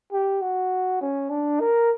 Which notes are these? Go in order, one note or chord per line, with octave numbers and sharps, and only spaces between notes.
G4
F#4
C#4
D4
A#4